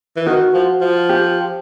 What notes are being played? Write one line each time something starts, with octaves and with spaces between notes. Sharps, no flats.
E3
D#3 F#4
F3
F3
G4